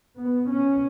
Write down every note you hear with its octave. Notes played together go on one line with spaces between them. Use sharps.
B3
C#4